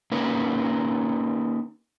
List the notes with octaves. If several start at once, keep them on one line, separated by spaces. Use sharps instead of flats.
A#3 C#4 D#4 A#4 B4